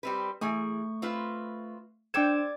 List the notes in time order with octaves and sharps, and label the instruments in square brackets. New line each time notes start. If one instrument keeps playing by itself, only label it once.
[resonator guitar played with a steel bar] G3 C4 B4
[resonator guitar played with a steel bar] E3 G#4 G#5 [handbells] A3 C#6
[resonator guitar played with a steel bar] C4 F4 B4
[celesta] D4 E7 [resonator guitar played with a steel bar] A4 C5 G5 [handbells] D5 D6 G#6